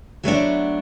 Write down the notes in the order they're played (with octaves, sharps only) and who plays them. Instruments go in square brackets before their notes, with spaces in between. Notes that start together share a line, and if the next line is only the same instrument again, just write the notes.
[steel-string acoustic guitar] F#3 A3 B3 D4